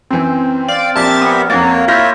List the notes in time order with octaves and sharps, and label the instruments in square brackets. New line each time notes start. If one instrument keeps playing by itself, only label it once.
[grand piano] F#2 E3 [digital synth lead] C4
[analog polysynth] D5 [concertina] F5
[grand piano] A#1 [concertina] G4 A#4 E5 [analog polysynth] A5 A6
[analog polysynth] B3
[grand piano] F2 A6 [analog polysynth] A#3 [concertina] F#4 C#5
[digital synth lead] E4 [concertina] F4 C#5 E5 [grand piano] F6 G6 A#6